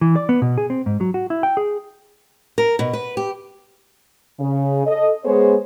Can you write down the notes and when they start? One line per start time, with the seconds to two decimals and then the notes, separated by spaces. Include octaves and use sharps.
0.01 E3
0.16 D5
0.29 B3
0.42 B2
0.58 G#4
0.70 C4
0.86 G#2
1.01 F#3
1.14 F#4
1.30 E4
1.43 G5
1.57 G#4
2.58 A#4
2.79 B2
2.93 B4
3.17 G4
4.40 C#3
4.86 A4 D#5
5.25 G#3 B3 G#4 C5 C#5